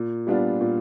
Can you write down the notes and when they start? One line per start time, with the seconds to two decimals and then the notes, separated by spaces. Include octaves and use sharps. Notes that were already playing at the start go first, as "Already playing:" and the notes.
Already playing: A#2
0.27 G3 B3 D4 F4
0.61 A#2